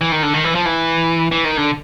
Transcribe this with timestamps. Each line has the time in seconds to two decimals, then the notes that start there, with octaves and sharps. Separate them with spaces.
0.01 E3
0.12 D#3
0.23 D3
0.34 D#3
0.44 E3
0.55 F3
0.65 E3
1.31 E3
1.44 D#3
1.57 D3